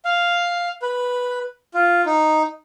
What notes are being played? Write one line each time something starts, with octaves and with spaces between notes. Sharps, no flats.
F5
B4
F4
D#4